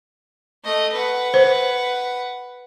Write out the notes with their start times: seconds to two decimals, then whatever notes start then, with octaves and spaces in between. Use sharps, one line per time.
0.65 A3 D#5
0.93 B4 F#5
1.34 C5